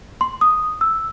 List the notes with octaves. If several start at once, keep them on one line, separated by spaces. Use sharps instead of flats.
C6
D#6
E6